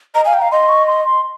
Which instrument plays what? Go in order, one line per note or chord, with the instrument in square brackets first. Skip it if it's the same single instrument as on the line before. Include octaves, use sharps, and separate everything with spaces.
[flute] D#5 [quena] A#5
[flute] F5 [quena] G#5
[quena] G5
[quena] F5 [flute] A#5
[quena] D#5 [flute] C6
[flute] C#6
C6
C6